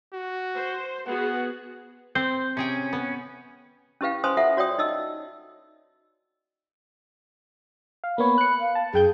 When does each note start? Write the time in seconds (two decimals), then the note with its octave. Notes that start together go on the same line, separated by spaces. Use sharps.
0.13 F#4
0.55 C5
1.06 B3 F#4 G#4 F#5
2.15 C4 C5
2.57 C3 C#4 G#4 G5
2.93 B3
4.01 C#4 E4 G4 B4 F5 G5
4.24 C#4 B4 C5 G#5 C6 D#6
4.37 F4 A4 E5 F#5
4.57 F#4 C#5 D5 G5 D#6
4.78 D#4 D#5 E6
8.04 F5
8.18 A#3 B3 C#5 B5
8.38 F#6 C#7
8.60 F5
8.75 A5
8.94 F#2 G#4 G5 G6